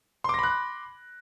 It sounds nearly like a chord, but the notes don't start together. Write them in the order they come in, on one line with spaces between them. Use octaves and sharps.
C6 D6 A#6 B5 F#6